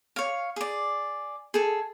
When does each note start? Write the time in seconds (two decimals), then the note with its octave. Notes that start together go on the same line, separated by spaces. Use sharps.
0.16 C#5 F5
0.56 G#4 D5
1.54 G#4 A4